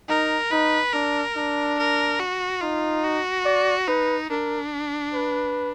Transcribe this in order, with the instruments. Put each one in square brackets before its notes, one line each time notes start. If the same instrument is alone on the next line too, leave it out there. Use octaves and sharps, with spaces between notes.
[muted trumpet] D#4 [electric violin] A#4
[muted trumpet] D#4 [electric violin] B4
[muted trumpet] D4 [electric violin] A#4
[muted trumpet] D4
[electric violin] A#4
F#4
[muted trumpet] D#4 [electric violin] F4
[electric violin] F#4
[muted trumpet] D5
[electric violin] D#4 [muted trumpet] B4
[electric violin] D4 [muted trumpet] A#4
[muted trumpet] B4